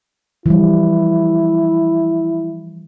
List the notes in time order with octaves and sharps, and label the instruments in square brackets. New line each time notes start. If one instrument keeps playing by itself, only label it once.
[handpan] E3 F3 G3 [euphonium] E4